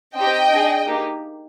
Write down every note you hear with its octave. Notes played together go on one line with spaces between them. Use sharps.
C4 D#4 G4 D#5 G5
D4 G#4
A#3 D#4 G4